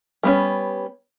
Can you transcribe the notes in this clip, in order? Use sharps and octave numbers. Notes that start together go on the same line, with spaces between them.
G3 B3 C#4